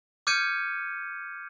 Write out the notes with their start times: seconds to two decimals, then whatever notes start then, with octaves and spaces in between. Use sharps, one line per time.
0.27 D6 F6 G6 G#6 C#7 D#7